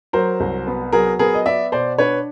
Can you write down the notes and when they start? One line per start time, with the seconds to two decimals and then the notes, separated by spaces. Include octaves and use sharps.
0.13 F#3 A#4 C5
0.40 C2
0.67 B3
0.92 F#3 G#4 A#4
1.19 B3 G#4 A#4
1.34 D#5
1.46 B3 D5 E5
1.72 B2 C5 D5
1.98 D4 B4 C#5